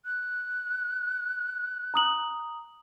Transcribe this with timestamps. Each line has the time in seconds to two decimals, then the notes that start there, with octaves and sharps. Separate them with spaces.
0.06 F#6
1.94 A#5 D#6 F#7